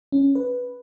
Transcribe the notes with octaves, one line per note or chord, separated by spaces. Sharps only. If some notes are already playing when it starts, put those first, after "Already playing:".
C#4
B4